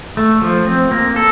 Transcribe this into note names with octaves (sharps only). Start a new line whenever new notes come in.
A3
F3
C4
A#3
A4